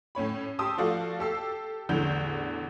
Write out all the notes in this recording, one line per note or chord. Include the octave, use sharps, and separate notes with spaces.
A2 C#4 C#5 B5
G4 A5 C6 D#6 E6
F3 A3 F#4 A4 D5 F5
G4 A4 E6 C7
A1 E2 D3 E3 G6